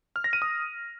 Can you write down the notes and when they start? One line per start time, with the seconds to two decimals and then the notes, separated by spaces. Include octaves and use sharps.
0.16 F6
0.24 A#6
0.33 D#7
0.42 D#6